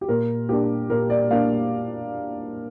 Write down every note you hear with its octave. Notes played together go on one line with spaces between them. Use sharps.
G4
A#2 A#4
A#3 D4 G4
A#2 A#4
D5
A#3 D4 F5